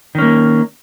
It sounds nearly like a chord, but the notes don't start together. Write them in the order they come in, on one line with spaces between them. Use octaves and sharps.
D#3 C#4 A#3